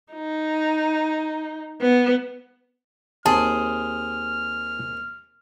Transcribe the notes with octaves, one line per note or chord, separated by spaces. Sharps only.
D#4
B3
D#2 C4 G#4 A5 F6